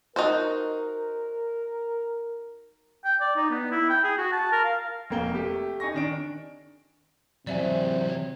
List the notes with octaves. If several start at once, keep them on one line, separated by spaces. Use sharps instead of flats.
D#4 F#4 A#4 C5
G5
D5
D#4
B3
E4
G5
G#4
F#4
A5
A#4
F5
F1 A#3 G7
A3 G4
D#4 G#5 C#6 A#6
D#3 D4 D7
C3 E3 F#3 D5 E5 G#5